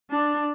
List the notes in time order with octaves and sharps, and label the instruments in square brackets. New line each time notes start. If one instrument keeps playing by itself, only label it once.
[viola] D4